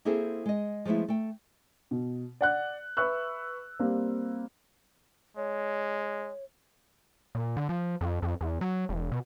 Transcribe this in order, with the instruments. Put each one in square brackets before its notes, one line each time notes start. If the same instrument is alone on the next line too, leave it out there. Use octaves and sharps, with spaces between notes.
[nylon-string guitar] A#3 C4 E4 G#4 A4 C5
G#3 D#5
F3 G#3 A3 B3 E4
A3 G5
[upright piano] B2
D5 F#5 F#6
B4 E5 C#6 E6 F#6
G3 A#3 C4
[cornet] G#3 [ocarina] C#5
[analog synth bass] A#2
D3
F3
F2
F2
E2
F#3
E1
B2